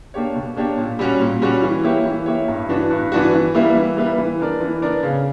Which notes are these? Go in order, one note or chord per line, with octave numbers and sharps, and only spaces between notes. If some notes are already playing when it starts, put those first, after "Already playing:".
A#3 D4 G4 C#5
B2
A#3 D4 G4 C#5
A#2
G3 C#4 F#4
A#2
G3 C#4 F#4
E3
A#3 E4 G4 C#5
E3
A#3 E4 G4 C#5
G2
E3 B3 D4 F#4
G2
E3 B3 D4 F#4
E3
G3 A#3 E4 B4
E3
G3 A#3 E4 B4
E3
B3 D4 A#4 D5
E3
B3 D4 A#4 D5
C#3